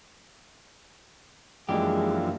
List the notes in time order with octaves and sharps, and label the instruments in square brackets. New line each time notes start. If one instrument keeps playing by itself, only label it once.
[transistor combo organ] F#2 E3 F3 [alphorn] G#3 [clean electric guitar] A#3 D4 G4